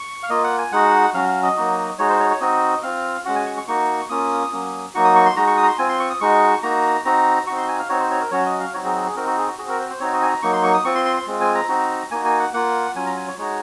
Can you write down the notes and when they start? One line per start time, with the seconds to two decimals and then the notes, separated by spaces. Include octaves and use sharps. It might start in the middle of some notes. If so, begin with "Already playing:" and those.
Already playing: C#6
0.23 F5
0.30 A#3 F4 D#5
0.44 F#5
0.58 G#5
0.72 G#3 D#4 F#4 F#5
1.14 F#3 C#4 F#4 F5
1.28 F5
1.43 D#5
1.56 F#3 A#3 D#4 F#4
1.98 G#3 D#4 F#4 C#5
2.09 C5
2.20 C#5
2.30 C#5
2.41 C4 D#4 F#4 D#5
2.83 C4 F4 F5
3.25 G#3 C#4 F#4 F#5
3.36 G#5
3.46 C#6
3.57 C#6
3.67 A#3 D#4 F#4 C#6
4.09 A#3 C#4 F4 D#6
4.52 F#3 A#3 C#4
4.94 F#3 A#3 D#4 F#4 C#6
5.04 D#6
5.16 C#6
5.26 C6
5.36 G#3 D#4 F#4 A#5
5.47 C#6
5.57 D#6
5.63 A#5
5.68 C6
5.78 C4 F4 G#5
5.89 C6
6.00 C#6
6.10 D#6
6.21 G#3 D#4 F#4 C#6
6.63 A#3 D#4 F#4 A#5
7.05 C4 D#4 F#4 A#5
7.47 C4 D#4 F#4 C#6
7.57 C6
7.68 G#5
7.79 F5
7.89 C4 D#4 F#4 C#5
8.00 C5
8.11 C#5
8.21 A#4
8.31 F#3 C#4 F#4 C#5
8.46 D#5
8.60 F5
8.74 F#3 C4 D#4 F#4 C#5
8.85 G#4
8.95 G#4
9.06 G#4
9.16 C4 D#4 F#4 A#4
9.26 F#4
9.37 G#4
9.48 F#4
9.58 C4 F#4 G#4
9.69 A#4
9.79 C5
9.90 C5
10.00 C4 D#4 F#4 C#5
10.14 D#5
10.22 G#5
10.29 A#5
10.42 F#3 A#3 D#4 C#6
10.53 C6
10.63 C#6
10.74 D#6
10.85 C4 F4 C#6
10.95 C6
11.05 C6
11.17 C6
11.27 G#3 C4 F4
11.41 G#5
11.55 A#5
11.69 C4 D#4 F#4
12.11 A#3 D#4 F#4 G#5
12.25 G#5
12.39 F#5
12.53 A#3 F4 F#5
12.96 F#3 C#4 F4 G#5
13.06 A#5
13.17 G#5
13.27 C#5
13.38 G#3 D#4 F#4 C#5